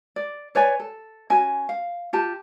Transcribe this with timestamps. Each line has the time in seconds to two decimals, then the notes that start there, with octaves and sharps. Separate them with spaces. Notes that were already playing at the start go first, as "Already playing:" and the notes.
0.16 D5
0.55 B4 C#5 D5 G#5
0.80 A4
1.30 C#4 F#4 G#5
1.69 F5
2.13 F4 G4 A5